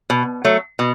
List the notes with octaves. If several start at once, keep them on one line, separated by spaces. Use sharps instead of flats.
B2
F#3 A3
B2